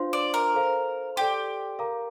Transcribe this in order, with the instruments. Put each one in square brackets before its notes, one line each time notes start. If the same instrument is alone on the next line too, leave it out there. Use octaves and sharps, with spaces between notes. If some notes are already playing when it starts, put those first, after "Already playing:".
Already playing: [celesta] D4 F4 C5 F5 C6
[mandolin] D5
A#4
[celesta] A4 C5 F5
[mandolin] G4 [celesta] A4 D5 G5 C6
[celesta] A#4 F5 A#5 D6